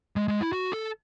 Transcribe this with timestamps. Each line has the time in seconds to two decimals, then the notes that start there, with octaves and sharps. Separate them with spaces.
0.16 G#3
0.28 G#3
0.40 E4
0.53 F#4
0.72 A4